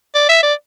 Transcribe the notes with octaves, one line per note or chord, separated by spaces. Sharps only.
D5
E5
D5